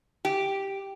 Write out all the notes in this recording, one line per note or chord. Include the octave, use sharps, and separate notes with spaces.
G4